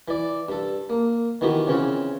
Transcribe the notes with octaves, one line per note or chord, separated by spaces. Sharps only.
E3 D5
G2 A4
A#3
D#3 E3 B3 F#4 G4
C#3 E3 C4 F4 C#5